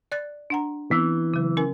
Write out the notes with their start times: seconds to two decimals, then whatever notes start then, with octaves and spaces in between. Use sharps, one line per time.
0.12 D5 F#6 A6
0.50 D4 F#5 A#5
0.91 E3 B3 C4
1.34 C#3 F#3
1.57 C#4 A#4 G#5